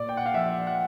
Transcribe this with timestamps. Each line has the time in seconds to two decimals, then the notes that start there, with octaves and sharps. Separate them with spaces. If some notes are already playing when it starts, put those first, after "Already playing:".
Already playing: A#2 D5
0.09 G5
0.17 F#5
0.26 F5
0.34 F3 E5
0.67 F#5